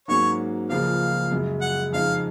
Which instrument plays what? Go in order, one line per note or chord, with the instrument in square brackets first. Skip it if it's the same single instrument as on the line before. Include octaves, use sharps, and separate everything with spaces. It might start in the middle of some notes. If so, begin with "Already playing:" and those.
[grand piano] G#2 F#3 A#3 C#4 [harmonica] C#5
[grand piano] C#2 C#3 F3 A#3 [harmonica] F5
[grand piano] F#2 C#3 G#3
[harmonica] F#5
[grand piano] F2 C#3 G#3 D#4 [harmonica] F5